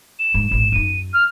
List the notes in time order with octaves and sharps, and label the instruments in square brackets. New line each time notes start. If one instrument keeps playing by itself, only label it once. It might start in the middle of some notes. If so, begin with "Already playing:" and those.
[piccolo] E7
[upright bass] G#2
A1 G#2
[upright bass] F#2 D#4 [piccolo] D#7
[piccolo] F6